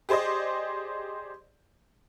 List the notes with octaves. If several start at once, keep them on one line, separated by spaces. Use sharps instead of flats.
G4 G#4 C5 D5 D#5